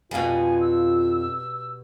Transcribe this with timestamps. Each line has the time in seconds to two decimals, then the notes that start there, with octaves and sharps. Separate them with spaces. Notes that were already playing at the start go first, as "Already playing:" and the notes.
0.11 F2 B2 G3 F4 F5 G#5
0.61 E6